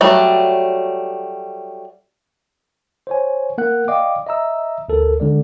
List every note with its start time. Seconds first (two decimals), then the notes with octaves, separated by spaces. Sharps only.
0.01 F#3 G3 A3
3.07 C5 C#5 G#5
3.58 A#3 A#4 F#5 F#6
3.88 D5 D#5 F5 G5 D6
4.27 D#5 E5 A#5 E6
4.89 D2 A4 A#4
5.20 D3 G#3 D5